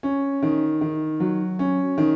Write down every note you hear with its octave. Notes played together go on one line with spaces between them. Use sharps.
C#4
D#3
D#3
F#3
C#4
D#3